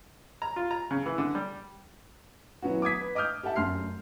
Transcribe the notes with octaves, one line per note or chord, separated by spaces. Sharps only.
A#5
F4
A#5
C#3
E3
D3
G3
E3 F#3 B3 C#4 F#4
D6 D#6 G#6 B6
B4
D#5 D6 D#6 F6 G6
G4 A4 E5 F#5 A5
F1 F#2 C6 F6 C7